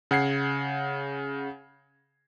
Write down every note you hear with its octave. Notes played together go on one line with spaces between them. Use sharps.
C#3 F#5 G#6 C7